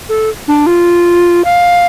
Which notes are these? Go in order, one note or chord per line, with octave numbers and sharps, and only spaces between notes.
A4
D4
F4
F5